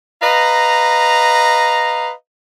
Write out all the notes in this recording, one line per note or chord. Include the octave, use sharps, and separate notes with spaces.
B4 D#5 F5 A#5